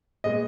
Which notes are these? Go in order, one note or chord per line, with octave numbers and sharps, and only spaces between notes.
A#2 G#3 B3 D#5